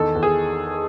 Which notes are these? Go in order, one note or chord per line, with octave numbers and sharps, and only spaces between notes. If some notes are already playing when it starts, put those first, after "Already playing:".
Already playing: E2 D#3 A4
E2
G#4